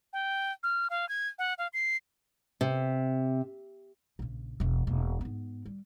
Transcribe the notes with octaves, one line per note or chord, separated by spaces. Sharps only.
G5
F6
F5
G#6
F#5
F5
C7
C3
A#1 C#3
E1 E3
E1 A#3
G#2 B3
G3